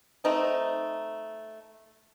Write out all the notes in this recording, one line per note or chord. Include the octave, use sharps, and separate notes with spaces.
A3 C4 D#4 D#5